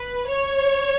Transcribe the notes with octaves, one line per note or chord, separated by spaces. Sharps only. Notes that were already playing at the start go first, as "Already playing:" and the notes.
Already playing: B4
C#5